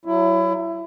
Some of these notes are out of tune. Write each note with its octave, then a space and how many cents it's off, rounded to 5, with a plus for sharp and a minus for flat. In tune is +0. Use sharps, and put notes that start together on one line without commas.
F#3 +10 E4 +25